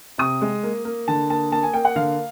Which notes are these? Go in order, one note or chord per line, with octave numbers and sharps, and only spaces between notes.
C3 D#6
G#3
A#3
A#3
D3 A5
A#3 A5
A#3 A5
G#5
A#3 G5
F#5
D3 F5